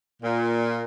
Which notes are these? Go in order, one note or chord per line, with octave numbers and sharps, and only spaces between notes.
A#2